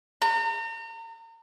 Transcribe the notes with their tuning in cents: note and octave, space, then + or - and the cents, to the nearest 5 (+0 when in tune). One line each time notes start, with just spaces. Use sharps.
A#5 -35